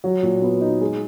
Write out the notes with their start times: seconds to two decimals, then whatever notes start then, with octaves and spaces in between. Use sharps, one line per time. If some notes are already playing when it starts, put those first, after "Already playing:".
0.04 F#3
0.23 A#2
0.42 B3
0.61 D#4
0.81 G#3